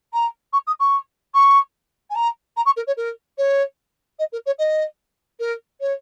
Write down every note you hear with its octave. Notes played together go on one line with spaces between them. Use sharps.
A#5
C#6
D#6
C#6
C#6
G#5
A#5
A#5
C#6
A#4
C#5
A#4
C#5
D#5
A#4
C#5
D#5
A#4
C#5